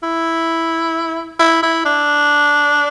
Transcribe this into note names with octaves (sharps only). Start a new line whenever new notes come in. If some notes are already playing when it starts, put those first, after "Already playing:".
E4
E4
E4
D4